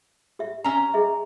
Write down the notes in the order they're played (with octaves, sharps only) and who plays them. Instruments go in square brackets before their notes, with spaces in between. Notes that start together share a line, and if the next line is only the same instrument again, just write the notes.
[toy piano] G4 E5
[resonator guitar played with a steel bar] C#4 A#5
[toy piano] G#4 D#5 E5